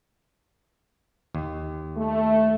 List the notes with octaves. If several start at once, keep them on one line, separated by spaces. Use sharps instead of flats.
D#2
A3